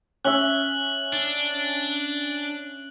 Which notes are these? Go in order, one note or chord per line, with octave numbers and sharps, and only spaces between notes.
C#4 E5 F#6 F#7 G7
D4